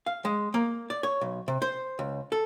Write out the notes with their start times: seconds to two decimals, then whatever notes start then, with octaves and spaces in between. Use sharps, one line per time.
0.06 F5
0.25 G#3
0.54 A#3
0.90 D5
1.03 C#5
1.21 B1
1.48 C3
1.62 C5
1.99 C#2
2.32 A4